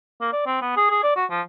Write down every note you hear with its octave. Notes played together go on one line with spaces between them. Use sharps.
A#3
D5
C4
B3
G#4
G#4
D5
F#4
F3